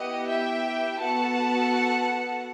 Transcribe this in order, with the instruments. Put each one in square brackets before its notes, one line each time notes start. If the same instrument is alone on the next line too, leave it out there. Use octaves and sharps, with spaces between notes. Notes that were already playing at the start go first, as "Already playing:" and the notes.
Already playing: [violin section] B3 E4 G4 D#5 F#5
E5 G5
B3 F#4 A4 F#5 A5